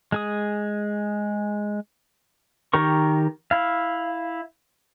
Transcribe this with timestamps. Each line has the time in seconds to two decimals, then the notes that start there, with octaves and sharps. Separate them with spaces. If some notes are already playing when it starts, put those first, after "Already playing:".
0.12 G#3 G#4 D#6
2.74 D#3 G4 A#4 C#6
3.51 E4 F5